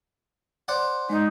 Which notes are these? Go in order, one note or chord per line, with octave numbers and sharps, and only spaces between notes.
C5 D5 F#5
G#3 D#4